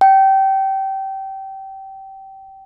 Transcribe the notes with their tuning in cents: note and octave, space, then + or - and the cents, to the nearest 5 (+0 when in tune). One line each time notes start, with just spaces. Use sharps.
G5 -20